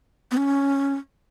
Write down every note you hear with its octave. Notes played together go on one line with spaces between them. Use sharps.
B3
C#4